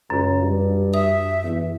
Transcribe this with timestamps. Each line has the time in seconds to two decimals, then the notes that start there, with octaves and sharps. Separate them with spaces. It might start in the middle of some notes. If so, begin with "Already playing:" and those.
0.10 C#2 F#2
0.42 G2
0.94 E5 D#6
1.43 E2